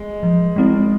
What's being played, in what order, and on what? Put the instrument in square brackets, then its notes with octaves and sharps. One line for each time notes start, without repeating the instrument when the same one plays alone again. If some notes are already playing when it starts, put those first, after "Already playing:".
Already playing: [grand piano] G#3
[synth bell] F3
G#3 C4 E4